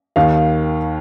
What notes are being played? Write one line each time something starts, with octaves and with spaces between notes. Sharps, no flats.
D#2 D#3 F5